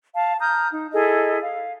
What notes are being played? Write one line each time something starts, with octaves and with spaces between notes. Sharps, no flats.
F5 A5
A#5 D#6 F6 G6
D#4
E4 G#4 A4 D#5
F5